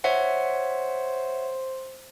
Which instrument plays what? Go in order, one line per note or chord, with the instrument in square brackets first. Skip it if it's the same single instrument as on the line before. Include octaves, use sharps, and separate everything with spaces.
[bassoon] C5 [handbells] C#5 E5 F#5